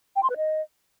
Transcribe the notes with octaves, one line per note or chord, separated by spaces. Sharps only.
G5
C6
B4
D#5